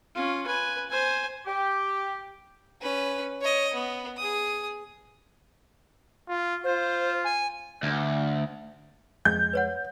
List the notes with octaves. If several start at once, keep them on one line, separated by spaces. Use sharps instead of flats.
C#4 F4
B4 G#5
C5 G#5
G4
C#4 B4
C#5 D#5
B3
G#4 D#6
F4
F4 C5
G#5
D2
F2 G#3 G6
B4 C#5 F#5